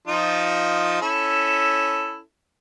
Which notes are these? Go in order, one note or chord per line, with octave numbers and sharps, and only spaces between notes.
F3 D#4 F4
C#4 E4 A4